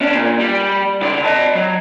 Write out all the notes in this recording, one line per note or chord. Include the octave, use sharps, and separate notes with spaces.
C#4 D4
A#2
G3
C#3 D5
D#5 A5
F#3